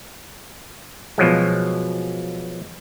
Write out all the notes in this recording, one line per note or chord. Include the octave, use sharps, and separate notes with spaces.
B2 F3 F#3 G#3